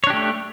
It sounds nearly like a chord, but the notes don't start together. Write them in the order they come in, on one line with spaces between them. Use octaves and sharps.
C#5 D4 G4 A3